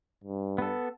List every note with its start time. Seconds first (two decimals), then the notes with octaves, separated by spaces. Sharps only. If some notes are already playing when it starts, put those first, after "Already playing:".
0.24 G2
0.58 B3 A4